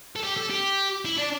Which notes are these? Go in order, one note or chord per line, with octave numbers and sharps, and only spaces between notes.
A4
G4
A4
G4
E4
D4